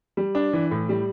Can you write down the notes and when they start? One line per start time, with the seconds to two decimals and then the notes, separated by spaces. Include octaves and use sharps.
0.17 G3
0.35 D4
0.53 E3
0.71 A2
0.89 G3